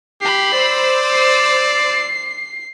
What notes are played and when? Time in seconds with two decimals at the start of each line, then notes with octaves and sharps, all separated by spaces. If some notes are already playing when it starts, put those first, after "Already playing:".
0.21 G4 B5 C7
0.53 C5 D5 E6
1.11 C7